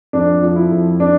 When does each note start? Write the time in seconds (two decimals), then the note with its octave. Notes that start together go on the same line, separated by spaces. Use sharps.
0.13 F2 D4
0.42 F3
0.56 E4
0.71 F2
1.00 D4